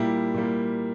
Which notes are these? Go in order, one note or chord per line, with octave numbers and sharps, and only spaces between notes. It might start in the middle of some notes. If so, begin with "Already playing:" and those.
Already playing: A#2 G3 A#3 E4 G4
A#2 G3 A#3